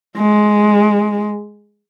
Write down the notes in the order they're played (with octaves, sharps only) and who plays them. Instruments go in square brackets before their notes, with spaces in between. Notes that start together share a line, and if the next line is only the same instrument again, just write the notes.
[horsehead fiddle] G#3